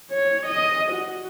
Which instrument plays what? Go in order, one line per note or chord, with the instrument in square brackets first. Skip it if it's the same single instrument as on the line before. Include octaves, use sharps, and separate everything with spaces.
[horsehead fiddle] C#5
D#5
F#4